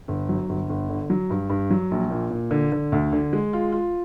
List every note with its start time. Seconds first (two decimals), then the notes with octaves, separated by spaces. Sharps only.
0.08 G1
0.29 F#3
0.49 G1
0.69 G1
0.89 D3
1.10 F#3
1.30 G2
1.50 G2
1.71 F#3
1.91 A#1
2.10 A#2
2.31 A#2
2.51 D3
2.72 D3
2.92 D2
3.13 D3
3.33 G#3
3.53 F4
3.72 F4